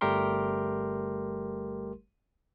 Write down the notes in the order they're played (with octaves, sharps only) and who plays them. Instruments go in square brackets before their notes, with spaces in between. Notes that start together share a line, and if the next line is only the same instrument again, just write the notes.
[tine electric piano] G1 G3 A3 G4 A#4 C6